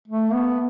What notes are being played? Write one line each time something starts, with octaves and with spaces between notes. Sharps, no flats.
A3
B3